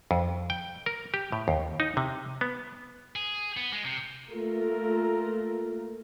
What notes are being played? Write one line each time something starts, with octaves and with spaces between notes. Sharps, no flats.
F2
G5
A#4
G4
A2
D#2
D#4
C3
B3
G#4
B3
G#3
C3
A3 A#3 F4 A#4